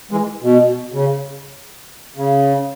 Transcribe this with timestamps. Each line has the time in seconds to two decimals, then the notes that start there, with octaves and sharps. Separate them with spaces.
0.11 E3 G#3
0.42 B2
0.93 C#3
2.16 C#3